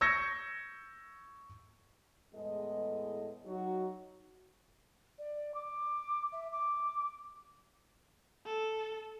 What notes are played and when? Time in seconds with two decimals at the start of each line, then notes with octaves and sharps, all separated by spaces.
0.01 C#6 E6 G6 G#6 A#6 C#7
2.34 E2 A2 G#3 A4 D#5
3.45 F#3 D#4 F#4
5.19 D5
5.55 D6
6.33 E5
6.52 D6
8.46 A4